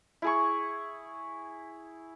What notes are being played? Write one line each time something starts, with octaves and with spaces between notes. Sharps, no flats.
E4 G#4 C#6